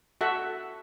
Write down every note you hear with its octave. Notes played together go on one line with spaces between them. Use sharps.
F#4 A4 E5 F#5